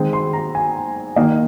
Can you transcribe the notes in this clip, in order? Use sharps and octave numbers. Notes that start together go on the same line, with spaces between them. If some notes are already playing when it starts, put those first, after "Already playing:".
Already playing: D#3 G#3 C4
C6
A#5
G#5
D#3 A#3 D#5